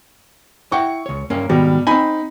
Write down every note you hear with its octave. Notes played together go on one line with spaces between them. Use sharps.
E4 F#5 G5 C#6
C#2 C#5
G2 A#3 C#4
G#2 B2 D#3 G3
C4 D#4 G#5 B5